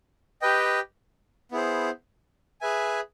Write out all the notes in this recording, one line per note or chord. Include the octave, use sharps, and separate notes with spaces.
G4 B4 D#5 G5
B3 E4 G#4 C5
G#4 B4 E5 G#5